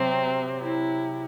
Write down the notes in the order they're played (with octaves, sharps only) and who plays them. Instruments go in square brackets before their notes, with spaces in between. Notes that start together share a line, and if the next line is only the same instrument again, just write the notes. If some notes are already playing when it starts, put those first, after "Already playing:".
Already playing: [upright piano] C3 F#3 [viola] C4
[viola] E4